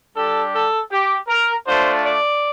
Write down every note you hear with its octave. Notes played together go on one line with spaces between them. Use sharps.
G3 D4 G4 A4
A4
G4
A#4
A3 D4 F4 C5
D5